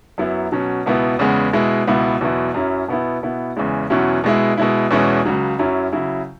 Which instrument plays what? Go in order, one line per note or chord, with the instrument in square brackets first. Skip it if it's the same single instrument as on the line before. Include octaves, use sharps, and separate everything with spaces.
[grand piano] F#2 F#3 B3 E4
B2 F#3 C#4
C#2 B2 B3 E4
E2 C#3 G#3 B3
B2 G#3 E4
C#2 B2 B3 E4
E2 B2 F#3 E4
F#2 F#3 C#4 E4
B2 B3 E4
B2 B3 E4
E2 C#3 G#3 E4
E2 B2 F#3 C#4 E4
B2 G#3 E4
B2 G#3 E4
E2 B2 G#3 C#4 E4
C#2 C#3 F#3
F#2 F#3 C#4 E4
C#3 F#3 E4